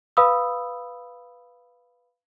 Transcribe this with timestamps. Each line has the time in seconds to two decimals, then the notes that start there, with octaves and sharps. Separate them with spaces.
0.17 B4 F5 B5 D#6 E6